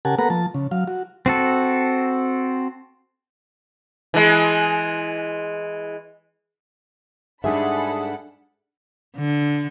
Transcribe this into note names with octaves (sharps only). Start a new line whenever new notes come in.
C#3 G4 A#4 F#5 G#5 A5
A#3 B3 A4 B4 F#5 A#5
F3 A5
C#3
F#3 F5
F#4
C4 F#4 A4
E3 G#3
G#2 G3 D4 G#4 A4 E5 F#5 B5
D3